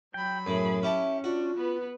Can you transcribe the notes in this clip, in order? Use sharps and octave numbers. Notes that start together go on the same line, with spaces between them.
F#3 G5 B5
F#2 A2 G#4
C#4 E4 G4 E5 A5
D4 F4 F#4
B3 B4